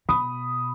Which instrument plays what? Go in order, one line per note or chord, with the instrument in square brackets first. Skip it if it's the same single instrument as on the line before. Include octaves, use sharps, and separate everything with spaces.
[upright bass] B2 [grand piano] B5 D#6